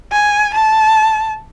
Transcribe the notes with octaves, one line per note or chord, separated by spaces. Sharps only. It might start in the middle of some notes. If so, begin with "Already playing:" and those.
G#5
A5